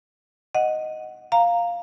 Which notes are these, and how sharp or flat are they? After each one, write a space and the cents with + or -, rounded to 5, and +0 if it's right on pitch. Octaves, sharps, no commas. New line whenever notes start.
D#5 +0 F#5 +0
F5 +0 A#5 +0